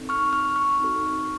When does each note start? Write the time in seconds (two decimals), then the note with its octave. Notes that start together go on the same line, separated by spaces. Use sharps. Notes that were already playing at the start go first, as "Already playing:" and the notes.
Already playing: C4 D#4 A4
0.09 C#6 F6
0.33 C#6 F6
0.56 C#6 F6
0.79 C4 D#4 F#4 A4